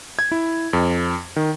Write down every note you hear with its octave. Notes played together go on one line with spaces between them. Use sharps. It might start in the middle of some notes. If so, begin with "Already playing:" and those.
G#6
E4
F2
D#3